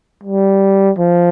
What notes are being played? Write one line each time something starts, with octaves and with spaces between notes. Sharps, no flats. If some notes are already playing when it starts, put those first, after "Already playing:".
G3
F3